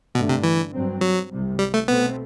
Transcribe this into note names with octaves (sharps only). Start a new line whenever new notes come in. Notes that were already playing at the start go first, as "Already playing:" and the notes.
G2 B2 D3 A3
C3
E3
G2 F#3 C4
F#3
C2 C3 G3
G3
A3
B2 A3 B3 C4